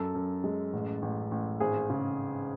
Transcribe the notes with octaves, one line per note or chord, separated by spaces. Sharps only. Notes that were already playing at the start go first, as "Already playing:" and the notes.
Already playing: F#2 A4
F#2
G#3
A1
A1
A1
G#1 G#4
C#3